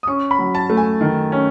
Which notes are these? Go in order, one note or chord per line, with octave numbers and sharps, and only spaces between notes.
D#6
C#4 C#6
B5
F#3
A5
A3
G#5
D#3
C#4